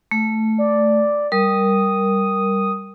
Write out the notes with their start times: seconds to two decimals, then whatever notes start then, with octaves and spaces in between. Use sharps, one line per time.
0.11 A3
0.58 D5
1.32 G3 A#4 D#6